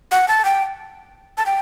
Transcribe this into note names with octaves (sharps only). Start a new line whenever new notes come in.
F#5
A5
G5
A5
G5